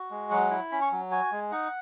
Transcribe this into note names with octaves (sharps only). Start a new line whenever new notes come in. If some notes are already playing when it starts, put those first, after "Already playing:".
Already playing: F#4
G#3
F#3 F#5
E4
C#4 B5
C#6
F#3
F#4 G#5
G#3
D#4 F#5